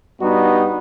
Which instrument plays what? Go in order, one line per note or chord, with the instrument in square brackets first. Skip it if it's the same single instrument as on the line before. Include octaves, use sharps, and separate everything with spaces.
[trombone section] G2 G3 B3 D#4 F#4